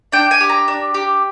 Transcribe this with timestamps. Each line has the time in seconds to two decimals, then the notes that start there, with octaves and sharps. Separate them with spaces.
0.12 D4 G5
0.31 G#5
0.40 G4
0.49 A#5
0.68 D4
0.94 G4